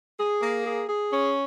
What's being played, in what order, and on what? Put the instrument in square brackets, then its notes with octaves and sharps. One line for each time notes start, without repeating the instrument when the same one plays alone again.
[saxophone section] G#4
A#3
G#4
G#4
C#4